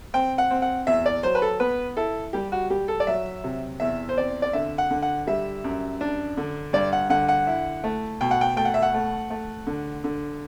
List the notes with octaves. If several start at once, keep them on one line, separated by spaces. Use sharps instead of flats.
C4 G5
F#5
C4
F#5
E2 E5
D5
F#3 C5
B4
A4
B3 B4
E4 A4
G3 G4
F#4
G3 G4
A4
D5
F#3 E5
C3
E2 E5
C5
C4 D5
D5
D3 E5
F#5
D3
F#5
G3 E5
F#2
D4
D3
G2 D5
F#5
D3 F#5
F#5
E4
A3
B2 G5
F#5
G5
A3 G5
F#5
E5
F#5
A3
A3
D3
D3